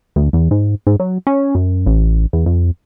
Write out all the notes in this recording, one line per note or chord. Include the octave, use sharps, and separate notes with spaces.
D2
E2
G#2
G#2
F#3
C#4
F#2
A1
E2
F2